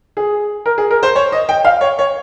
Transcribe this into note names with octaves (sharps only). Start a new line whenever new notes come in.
G#4
A#4
G#4
A#4
C5
C#5
D#5
G5
F5
C#5
C#5